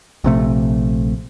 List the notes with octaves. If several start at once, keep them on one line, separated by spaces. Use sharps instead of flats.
A#1 C3 A3